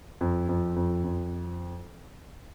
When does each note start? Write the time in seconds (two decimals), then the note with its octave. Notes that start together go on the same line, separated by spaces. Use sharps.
0.21 F2
0.49 F2
0.76 F2
1.04 F2